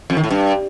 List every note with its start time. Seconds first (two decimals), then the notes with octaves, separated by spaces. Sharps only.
0.10 F2
0.17 D#3
0.24 A2
0.31 G2